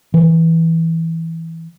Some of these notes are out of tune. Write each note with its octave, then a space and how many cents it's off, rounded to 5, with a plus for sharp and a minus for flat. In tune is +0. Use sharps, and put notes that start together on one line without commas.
E3 -10